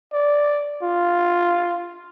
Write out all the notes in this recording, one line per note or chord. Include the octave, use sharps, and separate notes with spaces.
D5
F4